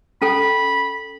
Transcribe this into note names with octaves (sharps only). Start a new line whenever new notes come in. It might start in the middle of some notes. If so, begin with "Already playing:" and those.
C#4 A4 G5 B5